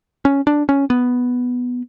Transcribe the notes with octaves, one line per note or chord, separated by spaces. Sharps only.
C#4
D4
C#4
B3